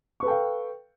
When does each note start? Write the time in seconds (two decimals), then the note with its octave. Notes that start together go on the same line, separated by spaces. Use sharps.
0.20 C#6
0.23 B4
0.25 A4
0.28 G5
0.30 F5